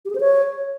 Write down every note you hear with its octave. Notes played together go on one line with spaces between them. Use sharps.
G4
G#4
C5
C#5